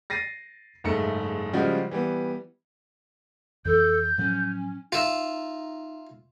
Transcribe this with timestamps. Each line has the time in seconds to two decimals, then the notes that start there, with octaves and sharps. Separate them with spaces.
0.10 A6 A#6 C7 D#7
0.84 F#1 G#2 A3 C#7
1.53 C#3 F3 G3 G#3 F#4
1.91 E3 G3 B3
3.65 F2 E3 A4 G6
4.18 A2 F3 F#3 C#4
4.92 D#4 F4 E5